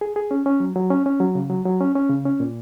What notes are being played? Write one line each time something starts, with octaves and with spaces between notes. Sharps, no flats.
G#4
G#4
C#4
C#4
F#3
F#3
C#4
C#4
F#3
C#3
F#3
F#3
C#4
C#4
C#3
C#4
A#2